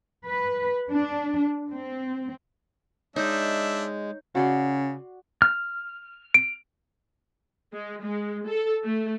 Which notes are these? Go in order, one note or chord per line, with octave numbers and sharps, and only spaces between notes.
B4
D4
C4
G#3 D4 D#4 C#5 E5 G6
C#3 F#4 D5 C6
F6
D7
G#3
G#3
A4
A3